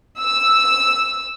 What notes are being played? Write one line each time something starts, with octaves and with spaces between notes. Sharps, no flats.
E6